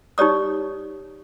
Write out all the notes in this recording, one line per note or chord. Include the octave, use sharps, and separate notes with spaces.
D#4 G4 C#5 D5 D#6